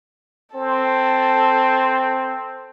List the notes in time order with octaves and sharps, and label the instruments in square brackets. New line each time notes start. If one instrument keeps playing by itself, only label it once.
[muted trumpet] C4 [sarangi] A4